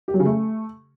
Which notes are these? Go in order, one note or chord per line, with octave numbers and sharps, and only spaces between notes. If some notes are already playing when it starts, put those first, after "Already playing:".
G4
F#3
C#3
A3